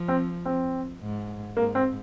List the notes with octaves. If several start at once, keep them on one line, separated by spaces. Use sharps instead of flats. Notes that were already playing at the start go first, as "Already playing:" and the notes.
Already playing: F3
C4
C4
G#2
G#2 A#3
C4